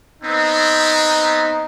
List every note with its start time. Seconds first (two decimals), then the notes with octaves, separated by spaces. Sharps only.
0.22 B3 C4 D#4